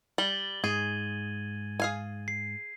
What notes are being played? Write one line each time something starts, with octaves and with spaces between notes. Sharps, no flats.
G3 A6 F#7 G7
G#2 G#4 G#6 D#7
G#4 F5 G#5
C7